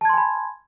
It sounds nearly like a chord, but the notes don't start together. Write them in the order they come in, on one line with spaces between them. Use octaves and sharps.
A5 G#6 C6 G#5 B5